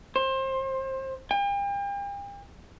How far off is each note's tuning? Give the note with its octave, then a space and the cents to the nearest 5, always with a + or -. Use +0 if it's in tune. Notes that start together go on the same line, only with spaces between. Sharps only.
C5 +25
G5 +40